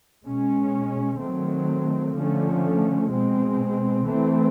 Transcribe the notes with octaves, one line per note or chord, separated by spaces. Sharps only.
B2 G#3 C#4
D#3 F#3 A3 C4
D3 F3 A3 C#4
B2 G#3 C4
E3 A3 C4